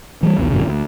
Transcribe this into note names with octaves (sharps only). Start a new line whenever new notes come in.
E3 F#3 G3
B1 E2 B2
G#1 F#2 B2 D3
D2